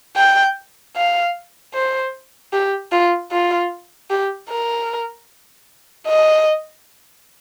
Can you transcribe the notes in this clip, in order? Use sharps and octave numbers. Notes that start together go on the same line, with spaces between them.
G5
F5
C5
G4
F4
F4
G4
A#4
D#5